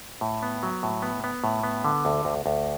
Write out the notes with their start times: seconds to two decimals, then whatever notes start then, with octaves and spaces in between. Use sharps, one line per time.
0.21 A2
0.43 B3
0.63 F#3
0.83 A2
1.02 B3
1.24 B3
1.44 A2
1.63 B3
1.85 D3
2.05 D2
2.25 D2
2.46 D2